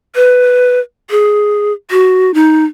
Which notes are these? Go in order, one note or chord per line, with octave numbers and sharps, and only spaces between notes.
B4
G#4
F#4
D#4